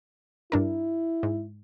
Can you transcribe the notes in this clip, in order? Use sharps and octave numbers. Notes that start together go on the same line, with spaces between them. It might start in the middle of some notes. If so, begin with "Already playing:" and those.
G2 D4 E4 A#4
G#2